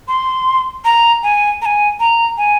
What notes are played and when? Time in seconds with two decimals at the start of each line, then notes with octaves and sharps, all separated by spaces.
0.08 C6
0.85 A#5
1.23 G#5
1.62 A#5
1.66 G#5
2.00 A#5
2.38 G#5